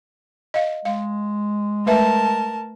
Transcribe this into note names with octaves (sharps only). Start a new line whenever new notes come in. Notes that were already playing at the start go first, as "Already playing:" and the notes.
D#5 F5
G#3 F5
A3 A#4 B4 E5 A5